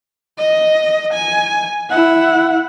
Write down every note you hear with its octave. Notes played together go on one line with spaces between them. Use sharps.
D#5
G#5
E4 F#5